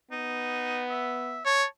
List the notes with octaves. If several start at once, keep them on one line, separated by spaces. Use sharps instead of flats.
B3 D#4
E5
C#5 A5